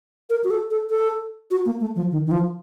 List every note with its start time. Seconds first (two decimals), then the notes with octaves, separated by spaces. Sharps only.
0.30 A#4
0.44 F#4
0.51 A4
0.70 A4
0.90 A4
1.51 F#4
1.65 A#3
1.81 A3
1.96 F3
2.11 D#3
2.26 D#3
2.31 F3